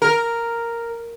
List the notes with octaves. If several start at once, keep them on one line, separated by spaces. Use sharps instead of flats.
A#4